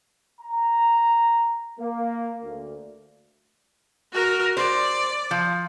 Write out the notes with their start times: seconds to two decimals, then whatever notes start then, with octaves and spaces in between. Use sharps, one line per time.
0.41 A#5
1.79 A#3
2.43 D2
4.13 F#4 A#4
4.57 C5 D5
5.31 F3